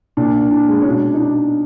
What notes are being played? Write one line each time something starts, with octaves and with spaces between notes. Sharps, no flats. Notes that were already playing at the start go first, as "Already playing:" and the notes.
A#2 D4
D4
G#3
C#4
B2 D4
D#4
D4